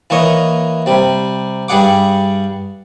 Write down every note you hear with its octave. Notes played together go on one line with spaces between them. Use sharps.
E3 A#3 C#5 D#5
C3 G3
G2 G3 G#4 F#5 D6